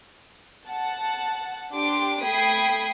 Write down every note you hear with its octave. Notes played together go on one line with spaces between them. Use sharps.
F#5 A5
D4 G4 C6 D6 D7
A3 G5 B5 D#6 G#6 C7